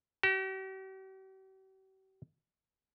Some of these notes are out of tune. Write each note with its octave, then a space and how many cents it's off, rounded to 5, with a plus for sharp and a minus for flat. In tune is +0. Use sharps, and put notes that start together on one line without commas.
G4 -45